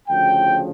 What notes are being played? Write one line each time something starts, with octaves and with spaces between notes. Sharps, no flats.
D2 C#3 F3 G5